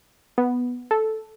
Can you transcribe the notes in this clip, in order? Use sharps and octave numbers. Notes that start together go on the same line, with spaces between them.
B3
A4